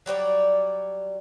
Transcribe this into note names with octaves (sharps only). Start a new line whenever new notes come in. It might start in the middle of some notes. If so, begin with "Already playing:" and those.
F#3 G3 C#5 D5